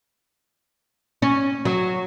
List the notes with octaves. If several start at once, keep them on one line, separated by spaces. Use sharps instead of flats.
C#4
F#3